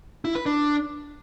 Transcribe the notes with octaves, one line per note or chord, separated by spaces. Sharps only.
E4
B4
D4